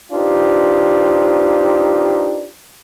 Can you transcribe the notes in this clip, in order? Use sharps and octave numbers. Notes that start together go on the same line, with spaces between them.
C4 D4 D#4 F4 G4 B4